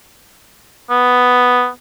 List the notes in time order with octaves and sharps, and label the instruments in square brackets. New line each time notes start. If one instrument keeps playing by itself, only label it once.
[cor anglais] B3